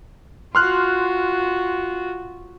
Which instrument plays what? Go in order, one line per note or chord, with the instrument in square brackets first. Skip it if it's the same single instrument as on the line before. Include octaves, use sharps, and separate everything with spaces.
[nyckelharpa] F4 F#4 [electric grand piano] C6 F6 F#6